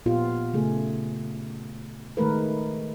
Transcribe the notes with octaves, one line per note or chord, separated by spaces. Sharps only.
A#2 B3 F4 G4
C#3 A3 G#4
D#3 G#3 A3 A#4 B4